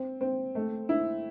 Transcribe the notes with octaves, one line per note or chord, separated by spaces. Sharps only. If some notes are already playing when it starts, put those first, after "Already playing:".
Already playing: C4
C4
A3
E4